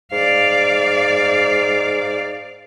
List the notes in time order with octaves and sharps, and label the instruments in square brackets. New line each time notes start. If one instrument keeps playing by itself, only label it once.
[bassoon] G#2 [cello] D5 F5